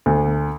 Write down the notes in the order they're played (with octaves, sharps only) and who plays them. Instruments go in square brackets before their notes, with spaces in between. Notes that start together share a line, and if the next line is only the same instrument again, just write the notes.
[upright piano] D2